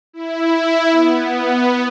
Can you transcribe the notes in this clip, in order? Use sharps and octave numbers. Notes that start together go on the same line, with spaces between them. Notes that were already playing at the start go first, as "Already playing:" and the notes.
E4
B3